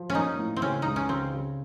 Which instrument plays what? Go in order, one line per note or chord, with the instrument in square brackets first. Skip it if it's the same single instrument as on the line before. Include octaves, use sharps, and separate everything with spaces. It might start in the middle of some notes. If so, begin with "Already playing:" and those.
Already playing: [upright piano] F3
[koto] C#4
[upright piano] A#3 [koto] D#4
[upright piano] A2
[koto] C4
[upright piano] C#3 [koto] C#4
[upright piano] C#2 [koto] D#4
[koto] C#4
[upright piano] C#3 [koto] C4
[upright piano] C#3